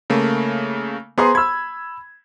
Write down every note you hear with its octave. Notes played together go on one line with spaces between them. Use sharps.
C#3 A3 A#3
B3 G#4 C5 A#5 C6
B5 E6 G#6